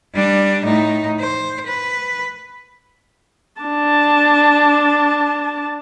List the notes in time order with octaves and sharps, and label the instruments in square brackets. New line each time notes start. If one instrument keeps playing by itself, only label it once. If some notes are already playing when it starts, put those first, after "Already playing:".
[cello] G3 D4
A2 D#4
C5
B4
[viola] D4 A5